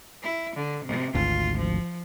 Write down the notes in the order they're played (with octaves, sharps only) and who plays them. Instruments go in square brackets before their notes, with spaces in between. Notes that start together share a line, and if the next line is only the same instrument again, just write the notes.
[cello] E4
D3
C3
[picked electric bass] G#1 D2 [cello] F4
[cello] F3